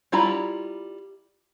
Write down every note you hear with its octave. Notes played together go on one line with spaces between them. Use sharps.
G3 E4 F4 A#5 B5